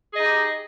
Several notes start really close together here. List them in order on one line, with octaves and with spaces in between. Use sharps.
G#4 D#5 D#4 G4